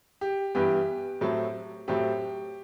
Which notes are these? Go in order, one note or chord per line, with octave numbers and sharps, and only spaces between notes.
G4
G2 E3 B3 G4
A2 F#3 A3 C4
A2 F#3 A3 C4 G4